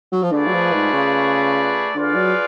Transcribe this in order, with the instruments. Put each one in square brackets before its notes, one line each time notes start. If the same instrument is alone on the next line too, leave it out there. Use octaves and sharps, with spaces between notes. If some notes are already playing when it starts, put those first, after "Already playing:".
[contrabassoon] F#3
F3
[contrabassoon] D3 [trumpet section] A3 F4 G#4 B4 D5
[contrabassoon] F#3
F3
G#2
C#3
[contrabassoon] D3 [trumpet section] F4 G#4 B4 D5 F5
[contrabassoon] F#3